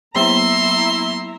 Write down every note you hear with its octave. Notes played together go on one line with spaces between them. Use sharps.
F#3 A#3 B3 E4 E5 A#5 C6